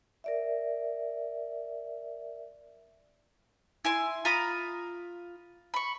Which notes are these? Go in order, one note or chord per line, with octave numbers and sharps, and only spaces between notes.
A#4 D5 E5
E4 G#5 C6
F4 A#5 B5 D#6
B5 C#6